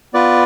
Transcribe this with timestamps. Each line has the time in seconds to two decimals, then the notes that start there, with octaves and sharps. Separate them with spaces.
0.14 B3 F4 B4 D5